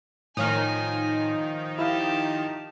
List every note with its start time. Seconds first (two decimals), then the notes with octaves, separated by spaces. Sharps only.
0.37 A2 D#3 F3 D#4 C#5 G#5 F6
1.79 E4 G4 F5 A5